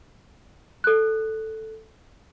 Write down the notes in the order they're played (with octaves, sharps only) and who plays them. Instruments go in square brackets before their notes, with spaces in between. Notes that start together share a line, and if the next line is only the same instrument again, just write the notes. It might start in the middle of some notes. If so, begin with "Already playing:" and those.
[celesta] A4 F#6